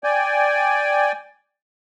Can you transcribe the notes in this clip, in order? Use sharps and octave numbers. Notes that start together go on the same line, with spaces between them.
D5 G5 G#5